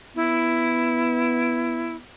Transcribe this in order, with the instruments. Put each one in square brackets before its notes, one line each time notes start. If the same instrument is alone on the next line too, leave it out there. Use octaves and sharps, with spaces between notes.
[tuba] B3 [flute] E4